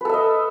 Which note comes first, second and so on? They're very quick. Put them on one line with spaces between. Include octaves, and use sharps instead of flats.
B4 A4 E5 D#5